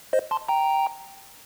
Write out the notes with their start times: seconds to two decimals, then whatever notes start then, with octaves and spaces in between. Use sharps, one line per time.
0.13 C5 D#5
0.31 A5 C6
0.48 G5 A#5